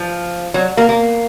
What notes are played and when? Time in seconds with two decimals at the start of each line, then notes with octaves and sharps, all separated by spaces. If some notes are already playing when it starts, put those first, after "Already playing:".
Already playing: F3
0.54 F#3
0.77 A#3
0.89 A#3